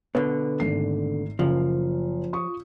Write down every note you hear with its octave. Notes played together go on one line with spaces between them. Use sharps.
B2 D3 B4
G#1 A3 C7
F#1 F3
F4 C#6 D#6